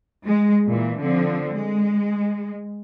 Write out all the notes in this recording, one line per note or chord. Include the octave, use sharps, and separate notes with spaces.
G#3
A#2 E3
D3 F3 C4
G#3